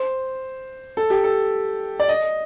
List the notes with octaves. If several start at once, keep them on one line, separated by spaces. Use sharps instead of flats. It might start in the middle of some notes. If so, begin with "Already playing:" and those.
Already playing: C5
A4
G4
A4
D5
D#5